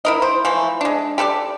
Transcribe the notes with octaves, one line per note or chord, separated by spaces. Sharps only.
E4 A#4 D#5
C5
E3 F3 A3
G#3 D4
G4 A4 B4 D5